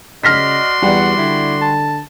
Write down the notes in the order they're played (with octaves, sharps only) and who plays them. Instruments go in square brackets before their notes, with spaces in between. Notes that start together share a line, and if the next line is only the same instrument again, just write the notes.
[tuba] C#3 [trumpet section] F#4 D5 C6 [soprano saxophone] D#5 [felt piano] F6 A#6 B6
[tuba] E2 [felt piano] G3 [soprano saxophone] F#5
[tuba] D3 [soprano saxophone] E4
[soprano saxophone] A5